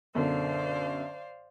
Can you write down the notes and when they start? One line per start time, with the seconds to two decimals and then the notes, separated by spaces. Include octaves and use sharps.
0.15 F#2 B2 D3 C5 D5 F5